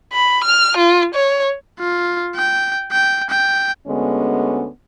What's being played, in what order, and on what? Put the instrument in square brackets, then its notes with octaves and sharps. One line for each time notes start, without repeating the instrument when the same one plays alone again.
[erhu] B5
F6
F4
C#5
[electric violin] F4
G5
G5
G5
[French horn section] D2 D3 G#3 B3 C#4